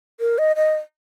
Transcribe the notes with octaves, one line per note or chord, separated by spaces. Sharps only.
A#4
D#5
D#5